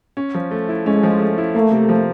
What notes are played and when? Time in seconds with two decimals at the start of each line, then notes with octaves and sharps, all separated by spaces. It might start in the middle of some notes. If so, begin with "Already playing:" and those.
0.17 C#4
0.35 F3
0.51 A3
0.69 E4
0.86 G#3 C#4
1.03 F3
1.20 A3
1.38 E4
1.54 A3 A#3
1.72 C3
1.89 F3